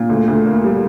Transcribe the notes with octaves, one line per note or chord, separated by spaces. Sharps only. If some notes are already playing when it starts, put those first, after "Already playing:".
Already playing: A#2
D2
D2
A#3
G3